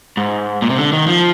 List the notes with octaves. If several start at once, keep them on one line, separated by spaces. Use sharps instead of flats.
G#2
A#2
C3
D3
D#3
F3